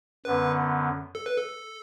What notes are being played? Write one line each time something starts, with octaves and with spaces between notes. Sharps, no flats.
F#2 D3 B3 B4
A4
B4
A4